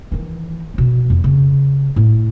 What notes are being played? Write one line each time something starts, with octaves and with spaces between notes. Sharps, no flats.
D#3 E3
B2 F3
F2
C#3 C#4
A2